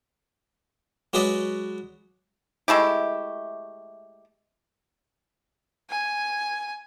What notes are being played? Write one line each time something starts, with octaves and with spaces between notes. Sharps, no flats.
F#3 G#3 F#4 B4 D5 D#5
G#3 A3 E4 G4
G#5